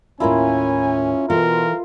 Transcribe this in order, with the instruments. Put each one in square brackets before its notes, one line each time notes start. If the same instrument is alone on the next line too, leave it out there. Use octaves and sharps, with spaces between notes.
[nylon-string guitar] D#2 A2 [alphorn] C#4 [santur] E4 F4 A#4 [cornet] G#5
[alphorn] B2 [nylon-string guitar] E3 A4 [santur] F4 [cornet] A#4